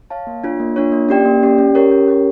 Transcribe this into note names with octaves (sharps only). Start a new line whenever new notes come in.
C#5 F5 A5
A#3
D4 F4 C#5
A#3
D4 F4 C#5
A#3
C#4 G4 D5 G5
A#3
C#4 G4 D5 G5
C#4
G4 A#4 C#5
C#4
G4 A#4 C#5